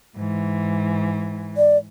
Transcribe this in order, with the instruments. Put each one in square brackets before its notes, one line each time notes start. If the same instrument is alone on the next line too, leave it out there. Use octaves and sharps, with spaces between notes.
[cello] G#2 E3
[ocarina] D5